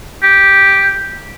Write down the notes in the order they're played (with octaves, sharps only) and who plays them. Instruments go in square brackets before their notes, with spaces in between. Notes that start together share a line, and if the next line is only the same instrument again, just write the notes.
[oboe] G4